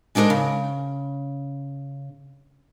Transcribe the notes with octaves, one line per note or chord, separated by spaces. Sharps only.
G#3 D4 D#4 F#4 A#4 C5
C#3